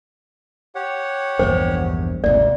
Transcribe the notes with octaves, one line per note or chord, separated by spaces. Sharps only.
G4 C#5 F#5
A#1 E2 G2 C5
D1 G#1 D2 C3 D5